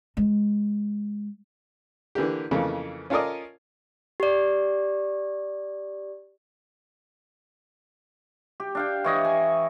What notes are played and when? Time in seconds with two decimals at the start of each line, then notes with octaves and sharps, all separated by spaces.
0.17 G#3
2.15 D3 E3 A#3 G4
2.51 F2 C#3 E3 A3 A#3
3.10 C#4 F4 A4 A#4 D5 D#5
4.20 G4 D5
8.60 G4
8.75 D4 F5 G5
9.04 E3 C#5 D#5
9.25 G#5